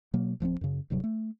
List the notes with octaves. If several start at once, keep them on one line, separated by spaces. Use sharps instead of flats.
B2 F#3 A#3
D1 F3 A3 C4
F#2 C#3
D1 G2 C3 F#3
A3